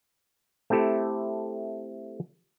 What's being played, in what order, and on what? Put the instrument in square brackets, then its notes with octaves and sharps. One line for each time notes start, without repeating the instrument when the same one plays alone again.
[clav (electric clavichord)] A3 C4 E4 G4 A4